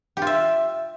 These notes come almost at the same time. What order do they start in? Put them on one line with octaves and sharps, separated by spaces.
G4 F4 E5